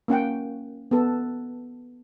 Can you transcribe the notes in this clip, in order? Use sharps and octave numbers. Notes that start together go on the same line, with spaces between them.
A#3 C#4 F#5 G5
B3 A4